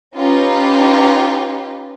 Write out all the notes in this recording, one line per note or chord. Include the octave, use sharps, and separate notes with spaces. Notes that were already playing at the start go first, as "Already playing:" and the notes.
C#4 D#4 F4 G4 B4